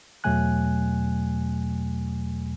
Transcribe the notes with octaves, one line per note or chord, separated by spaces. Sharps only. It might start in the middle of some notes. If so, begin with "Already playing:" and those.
E2 B2 F#3 A3 G#5 F#6